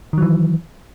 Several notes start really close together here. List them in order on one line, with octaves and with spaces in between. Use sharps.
D#3 F#3 E3